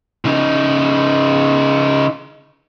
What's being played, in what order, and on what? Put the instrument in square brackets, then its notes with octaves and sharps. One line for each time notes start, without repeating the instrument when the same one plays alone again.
[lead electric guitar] C#3 D#4